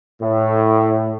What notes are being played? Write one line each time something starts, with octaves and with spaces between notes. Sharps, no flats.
A2